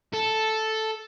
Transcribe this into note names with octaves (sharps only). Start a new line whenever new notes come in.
A4